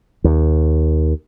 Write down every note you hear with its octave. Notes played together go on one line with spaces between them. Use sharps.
D#2